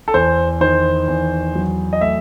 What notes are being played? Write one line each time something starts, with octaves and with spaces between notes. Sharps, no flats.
A4
E2 C5
D#3 C5
E2
F#3
D#5
A3 E5